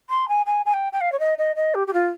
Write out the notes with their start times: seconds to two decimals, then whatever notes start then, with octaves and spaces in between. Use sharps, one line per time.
0.10 C6
0.28 G#5
0.46 G#5
0.66 G#5
0.74 G5
0.93 G5
1.01 F5
1.12 C#5
1.20 D#5
1.38 D#5
1.56 D#5
1.75 G4
1.87 G4
1.93 F4